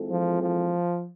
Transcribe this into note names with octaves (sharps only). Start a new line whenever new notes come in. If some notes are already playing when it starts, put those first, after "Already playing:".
Already playing: E3 G#3 C4 F4 A4
F3
F3